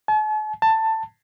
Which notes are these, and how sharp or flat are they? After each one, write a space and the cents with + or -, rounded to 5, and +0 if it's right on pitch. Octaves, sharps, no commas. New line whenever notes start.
A5 -45
A5 +15